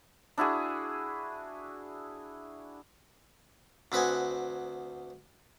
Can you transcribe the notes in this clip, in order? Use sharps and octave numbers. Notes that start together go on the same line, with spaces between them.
D4 E4 F#4 G#4
D2 C4 B4 D#5 F#5 G#5